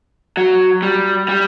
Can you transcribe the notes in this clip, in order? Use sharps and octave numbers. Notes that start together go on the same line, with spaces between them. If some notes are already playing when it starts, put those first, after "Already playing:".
F#3
G3
G3